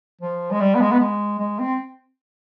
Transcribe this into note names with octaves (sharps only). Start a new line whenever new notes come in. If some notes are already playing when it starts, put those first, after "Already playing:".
F3
G#3
G3
B3
G#3
B3
G#3
G#3
C4